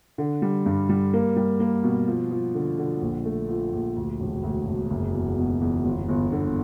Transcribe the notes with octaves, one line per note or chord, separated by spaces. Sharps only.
D3
G3
G2
G3
A#3
G3
A#3
B2
F3
F3
D3
D3
A#1
A3
F3
A#1
D2
E1
D2
E1
F#1
E2
B2
E2
G1
G1
D3